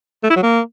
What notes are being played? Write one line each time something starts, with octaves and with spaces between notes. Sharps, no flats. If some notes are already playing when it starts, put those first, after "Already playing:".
A3
E4
F#3
A#3